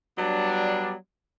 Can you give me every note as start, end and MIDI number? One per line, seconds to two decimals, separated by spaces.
0.18 0.93 54
0.18 0.93 55
0.18 0.93 59
0.18 0.93 62